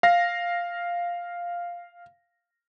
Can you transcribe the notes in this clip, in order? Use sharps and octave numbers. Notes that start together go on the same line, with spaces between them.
F5 A#6